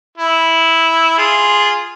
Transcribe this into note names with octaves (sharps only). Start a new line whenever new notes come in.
E4
F4 G#4